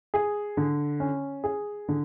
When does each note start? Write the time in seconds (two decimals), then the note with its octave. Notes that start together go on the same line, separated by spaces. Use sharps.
0.14 G#4
0.57 D3
1.00 C#4
1.44 G#4
1.88 D3